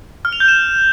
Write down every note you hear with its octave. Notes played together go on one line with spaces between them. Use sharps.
F6
F7
G6
E7